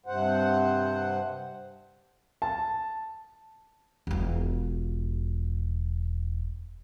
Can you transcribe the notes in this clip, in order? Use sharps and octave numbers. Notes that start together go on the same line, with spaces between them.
G2 C3 C5 F#5
A5
E1 F4